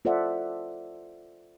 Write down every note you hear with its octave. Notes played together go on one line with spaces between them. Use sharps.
F4 A4 C5 D5 E5 F#5